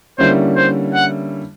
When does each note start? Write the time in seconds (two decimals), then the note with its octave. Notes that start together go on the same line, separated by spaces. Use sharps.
0.18 D3 G3 A#3 C#4 E4 C5
0.56 C5
0.94 F#5